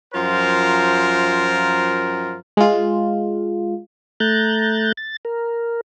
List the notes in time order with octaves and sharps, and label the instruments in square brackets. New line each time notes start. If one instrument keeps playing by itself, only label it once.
[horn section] F#2 F3 F4 A#4 C5
[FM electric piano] G#3 F4
[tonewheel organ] A3 A#5 F#6 G6 A6
A6
A#4